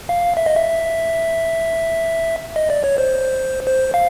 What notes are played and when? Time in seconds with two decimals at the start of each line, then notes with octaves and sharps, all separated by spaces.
0.09 F5
0.37 E5
0.46 D#5
0.56 E5
2.56 D#5
2.70 D5
2.84 C#5
2.98 C5
3.67 C5
3.94 F5